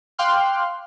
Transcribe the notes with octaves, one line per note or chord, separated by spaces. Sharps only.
F5 G5 C6 D6 F6 F#6